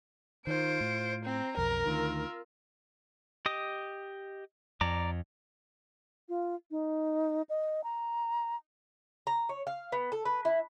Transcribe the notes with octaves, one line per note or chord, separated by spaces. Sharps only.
D#3 F4 C5 D7
A2
C4 A#5
B1 F2 A#4
D2 D#3 F4 E6
G4 D#5 D#6
F2 D5 A#5 D6
F4
D#4
D#5
A#5
A#5
C#5
F5
B3
A4
B4
E4